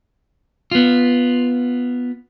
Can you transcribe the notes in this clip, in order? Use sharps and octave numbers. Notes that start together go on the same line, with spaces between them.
B3 F4